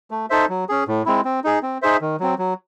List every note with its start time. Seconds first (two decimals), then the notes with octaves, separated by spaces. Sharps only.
0.11 A3
0.30 D#4 A4 C5 E5
0.49 F#3
0.69 C#4 G#4
0.88 A2
1.06 G#3 C4 E4
1.25 C4
1.44 D#4 G#4
1.63 C4
1.82 D#4 G#4 C5 E5
2.01 D#3
2.20 F#3 C4
2.38 F#3